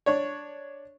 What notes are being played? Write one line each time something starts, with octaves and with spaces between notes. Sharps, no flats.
D4 C#5